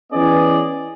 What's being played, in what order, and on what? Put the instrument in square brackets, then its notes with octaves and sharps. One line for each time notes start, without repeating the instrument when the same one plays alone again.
[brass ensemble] E3 B3 C#4 G#4 D5 D#5